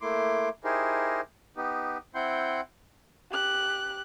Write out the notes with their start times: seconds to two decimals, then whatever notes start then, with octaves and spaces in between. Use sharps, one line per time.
0.01 A3 A#3 E4 C6 D6
0.64 D#4 E4 G4 G#4 A#4 C5
1.57 B3 D#4 G4
2.15 C4 E4 F#5 G5 C6 G6
3.31 G4 F#6